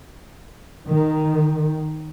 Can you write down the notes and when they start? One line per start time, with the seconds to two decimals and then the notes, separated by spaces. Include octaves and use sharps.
0.87 D#3